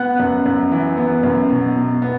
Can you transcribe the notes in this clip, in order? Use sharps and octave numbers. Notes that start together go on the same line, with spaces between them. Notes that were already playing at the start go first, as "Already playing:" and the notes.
Already playing: B3 F#5 F#6
F#2
F#2
E3
B3
F#2
B2
B2
B3